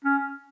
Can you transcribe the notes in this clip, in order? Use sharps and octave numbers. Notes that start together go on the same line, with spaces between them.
C#4